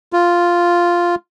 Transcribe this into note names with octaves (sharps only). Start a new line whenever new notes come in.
F4